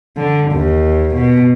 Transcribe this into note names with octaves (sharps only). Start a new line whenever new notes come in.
D3
D#2
B2